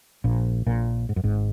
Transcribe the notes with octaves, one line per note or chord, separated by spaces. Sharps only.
A#1 A#2
A#1 A#2
G#2
F#2
G#1 G#2